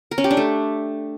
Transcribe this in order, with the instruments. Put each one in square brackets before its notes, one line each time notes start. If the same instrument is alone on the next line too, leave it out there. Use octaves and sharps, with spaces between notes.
[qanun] A#4
C#4
G4
D4
A3